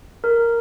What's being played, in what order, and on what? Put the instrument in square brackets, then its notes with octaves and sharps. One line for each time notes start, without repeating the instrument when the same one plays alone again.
[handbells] A#4